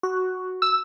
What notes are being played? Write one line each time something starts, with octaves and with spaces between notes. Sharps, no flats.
F#4
E6